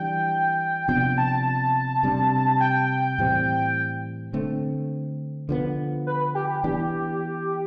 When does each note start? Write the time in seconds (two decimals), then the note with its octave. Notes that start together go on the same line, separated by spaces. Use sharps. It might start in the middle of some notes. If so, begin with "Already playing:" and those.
Already playing: E3 G3 D4 G5
0.88 C3 F3 B3 D4 G5
1.18 A5
2.03 C3 G3 D4
2.61 G5
3.18 A2 E3 G3 C4
4.33 D3 A3 C4
5.49 D3 F3 B3
6.07 B4
6.35 G4
6.50 G4
6.64 E3 B3 D4 G4